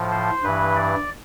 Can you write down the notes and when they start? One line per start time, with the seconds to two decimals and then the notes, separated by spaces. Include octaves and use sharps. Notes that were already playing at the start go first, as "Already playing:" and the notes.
Already playing: A2 F3
0.11 C5
0.43 G2 E3 B4
0.76 D5